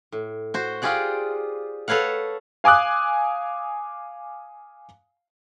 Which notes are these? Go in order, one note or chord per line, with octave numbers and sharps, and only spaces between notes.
A2
F#4 C5
F4 G4 G#4 D5 F#5
A4 B4 C#5 F5 F#5
F5 G#5 D6 D#6 F#6